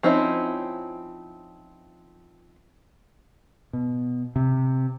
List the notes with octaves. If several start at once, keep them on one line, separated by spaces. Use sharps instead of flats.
F3 C4 C#4 D#4 E4
B2
C3